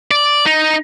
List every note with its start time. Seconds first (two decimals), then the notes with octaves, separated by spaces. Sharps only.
0.11 D5
0.46 D#4